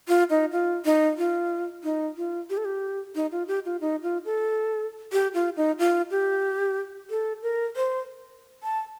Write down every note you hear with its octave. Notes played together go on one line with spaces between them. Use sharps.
F4
D#4
F4
D#4
F4
D#4
F4
G4
A4
G4
D#4
F4
G4
F4
D#4
F4
A4
G4
F4
D#4
F4
G4
A4
A#4
C5
A5